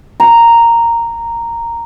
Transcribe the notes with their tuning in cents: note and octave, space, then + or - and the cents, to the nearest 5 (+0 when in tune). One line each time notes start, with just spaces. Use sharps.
A#5 -5